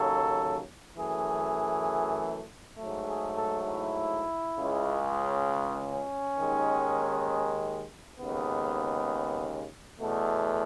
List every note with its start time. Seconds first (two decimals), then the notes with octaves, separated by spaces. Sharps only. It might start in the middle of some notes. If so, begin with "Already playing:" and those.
Already playing: D#2 C#3 F#3 A4
0.97 F#2 E3 A3 G#4
2.78 G#2 F#3 A3
3.08 G#4
3.38 A4
3.68 E4
4.58 C#2 C#3 G#3
5.94 C#4
6.39 D#2 D#3 G#3
8.19 D#2 C#3 G#3 B3
9.99 E2 B2 A3